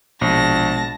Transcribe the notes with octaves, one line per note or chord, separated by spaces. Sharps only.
A#1 B2 G#3 A5 A#6